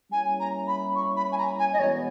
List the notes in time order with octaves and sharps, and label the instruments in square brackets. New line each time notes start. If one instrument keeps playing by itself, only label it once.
[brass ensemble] G3 A#3 C#4 E4 [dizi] G#5
[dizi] A#5
B5
C#6
B5
G#5
A#5
G#5
D#5
[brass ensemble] E2 B2 G#3 B3 [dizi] C#5